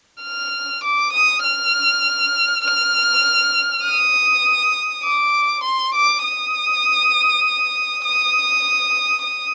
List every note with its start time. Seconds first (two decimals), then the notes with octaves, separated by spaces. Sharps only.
0.23 F6
0.84 D6
1.13 D#6
1.44 F6
2.64 F6
3.83 D#6
5.03 D6
5.63 C6
5.94 D6
6.24 D#6
8.04 D#6
9.24 D#6